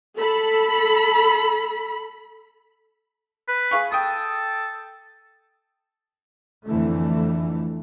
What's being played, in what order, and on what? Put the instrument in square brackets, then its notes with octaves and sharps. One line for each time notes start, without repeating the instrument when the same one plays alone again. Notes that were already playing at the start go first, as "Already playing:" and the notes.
[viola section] A4 B5
[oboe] B4
[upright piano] G#4 F5 C#6
[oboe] A4 [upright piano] G5 D#6
[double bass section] F2 D3 E3 A3